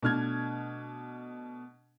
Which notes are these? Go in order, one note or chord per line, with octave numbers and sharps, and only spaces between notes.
B2 A3 D4 F6 F#6 G#6